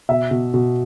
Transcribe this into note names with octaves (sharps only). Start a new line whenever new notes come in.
B2 E5
B2
B2